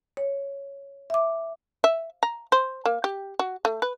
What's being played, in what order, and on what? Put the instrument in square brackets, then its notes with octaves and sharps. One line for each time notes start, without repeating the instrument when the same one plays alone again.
[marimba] C#5
E5 D6
[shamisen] E5
A#5
C5
A#3
G4
F#4
A3
B4